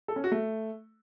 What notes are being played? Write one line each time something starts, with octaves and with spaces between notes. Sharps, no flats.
A4
C#4
F#4
A3